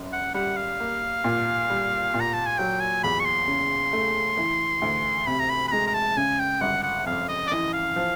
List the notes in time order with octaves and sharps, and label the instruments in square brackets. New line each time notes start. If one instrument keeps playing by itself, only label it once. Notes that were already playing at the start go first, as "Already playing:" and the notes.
Already playing: [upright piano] G1 F#2
[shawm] F#5
[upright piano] G3 [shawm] F#5
[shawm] F5
[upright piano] A#3
A#2
G3
A#2
[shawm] A#5
A5
G#5
[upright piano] F#3 [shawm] G5
[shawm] G#5
[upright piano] E2 [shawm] B5
[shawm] C#6
C6
[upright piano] C#3
A3
E3
D2
[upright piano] C3 [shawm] B5
[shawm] A#5
B5
B5
[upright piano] G#3 [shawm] A#5
[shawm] A#5
A5
[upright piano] C#3 [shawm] G#5
[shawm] G5
[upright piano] G1 [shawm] F#5
[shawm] F#5
[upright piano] F2 [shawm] F5
[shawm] D#5
D5
[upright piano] E3 [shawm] D#5
[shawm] F5
[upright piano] F3